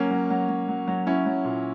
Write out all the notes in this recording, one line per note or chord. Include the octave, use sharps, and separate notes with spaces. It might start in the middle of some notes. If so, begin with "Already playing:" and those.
Already playing: F#3 A#3 C#4
F#3
F#3
F#3
F#3
F#3
F#3 C#4 E4
F#3
A#2